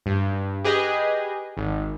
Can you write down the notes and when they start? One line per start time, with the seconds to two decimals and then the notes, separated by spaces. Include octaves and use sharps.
0.06 G2
0.64 G4 G#4 B4 D#5
1.57 G#1